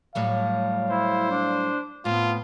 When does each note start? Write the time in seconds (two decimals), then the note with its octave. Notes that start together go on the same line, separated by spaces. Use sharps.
0.15 A2 F#3 G3 F5
0.90 E4 C5
1.30 D4
2.05 A2 B3 C4 F4